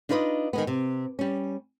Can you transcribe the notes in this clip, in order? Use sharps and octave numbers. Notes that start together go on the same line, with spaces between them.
D4 D#4 F4 B4 C#5 D#5
D#3 G#3 B3
C3
G3 C#4